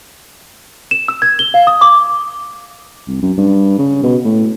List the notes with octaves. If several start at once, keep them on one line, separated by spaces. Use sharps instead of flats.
E7
E6
G#6
G7
F5
D#6
D6
C2
F#2
G2
C#3
B2
A2